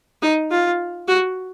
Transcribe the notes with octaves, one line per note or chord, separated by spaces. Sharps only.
D#4
F4
F#4